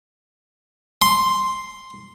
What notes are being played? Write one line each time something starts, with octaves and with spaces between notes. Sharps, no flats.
C6